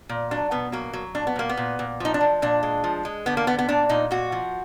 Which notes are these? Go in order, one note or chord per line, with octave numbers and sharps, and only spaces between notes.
A#2
F#3 D4
B2 B3
F#3 A#3
F#3
A#2 D4
B3
A#2 A#3
B3
A#2
A#2
F3 D#4
D4
F3
A#2 D4
G#3
F3
G#3
D3 B3
A#3
D3 B3
B3
A#2 D4
A#2 D#4
A#2 F#4
F3